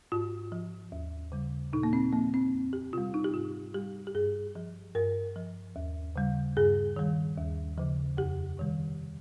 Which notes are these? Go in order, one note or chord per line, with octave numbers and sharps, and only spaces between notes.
G#2 F4
F3
D#2
C#3 G3
A#2 D#4
A#3
C4
F3 A#3
C4
F2
G4
C3 G3 F4
D#4
G4
G#2 F4
G3 G4
G4
G2 G#4
F3
G2 A#4
F3
D#2
C#3 G3
G2 G#4
D#3 G3
D#2
C#3 F3
F2 G4
C3 D#3 G3